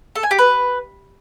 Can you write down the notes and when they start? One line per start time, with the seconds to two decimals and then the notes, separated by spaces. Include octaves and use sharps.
0.16 A4
0.23 G#5
0.31 G4
0.38 B4